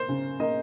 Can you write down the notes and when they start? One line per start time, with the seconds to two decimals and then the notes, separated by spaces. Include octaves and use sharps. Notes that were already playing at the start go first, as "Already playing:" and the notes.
Already playing: A#3 C5
0.09 C#3
0.40 A#3 D#5